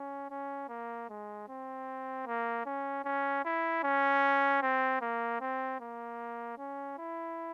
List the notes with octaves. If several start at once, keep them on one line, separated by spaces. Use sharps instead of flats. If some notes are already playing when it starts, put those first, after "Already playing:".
Already playing: C#4
C#4
A#3
G#3
C4
A#3
C#4
C#4
E4
C#4
C4
A#3
C4
A#3
C#4
E4